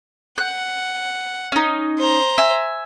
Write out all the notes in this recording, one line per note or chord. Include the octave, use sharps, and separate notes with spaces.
F#5 F#6
C#4 D#4
C5 A#5
E5 G#5